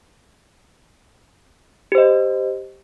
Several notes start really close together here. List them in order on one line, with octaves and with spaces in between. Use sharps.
G4 C5 D#5